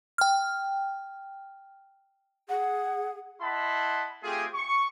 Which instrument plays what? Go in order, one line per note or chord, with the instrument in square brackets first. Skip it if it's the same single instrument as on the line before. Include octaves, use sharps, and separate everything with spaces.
[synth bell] G5 F6
[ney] G#4 [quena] F#5
[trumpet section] E4 D#5 F#5 A5 B5 C6
A3 C4 F4 G4 G#4
C#6